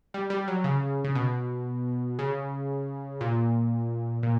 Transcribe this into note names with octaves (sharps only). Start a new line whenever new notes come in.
G3
G3
F#3
C#3
C#3
B2
C#3
A#2
A#2